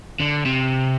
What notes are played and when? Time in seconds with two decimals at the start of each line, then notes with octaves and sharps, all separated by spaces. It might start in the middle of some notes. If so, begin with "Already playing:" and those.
0.20 D3
0.45 C3